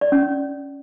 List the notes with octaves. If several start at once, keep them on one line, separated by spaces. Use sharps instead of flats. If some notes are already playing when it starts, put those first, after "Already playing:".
D5
C#4
C#4